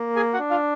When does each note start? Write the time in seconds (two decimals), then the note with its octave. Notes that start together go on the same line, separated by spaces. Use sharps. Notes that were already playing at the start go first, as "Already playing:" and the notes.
Already playing: A#3
0.16 G#4 G#5
0.34 F#4 F#5
0.39 D4
0.50 F4 F5